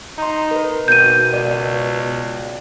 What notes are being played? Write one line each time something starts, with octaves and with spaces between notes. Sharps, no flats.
D#4 A#5 C6
A#4 B4
G#1 B2 G6 D#7
C#2 D5